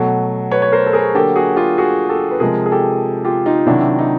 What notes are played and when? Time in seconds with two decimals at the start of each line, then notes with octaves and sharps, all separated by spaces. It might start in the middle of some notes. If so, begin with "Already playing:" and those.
Already playing: B2 F#3 A3
0.51 B4 C#5
0.62 C#5
0.72 A#4 C5
0.86 A4
0.93 G#4 A#4
1.15 D3 F#3 A#3 G4 A4
1.36 F#4 G#4
1.56 F4 G4
1.78 F#4 G#4
2.09 G4 A4
2.31 B4
2.40 C3 F3 G#3 G#4 A#4
2.66 G#4
2.72 G4 A4
3.25 F4 G4
3.46 D#4 F4
3.66 C3 D#3 F#3 D4 E4
3.99 D#4